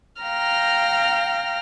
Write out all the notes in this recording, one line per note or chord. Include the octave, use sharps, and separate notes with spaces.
F5 G5 A#5 F6 A#6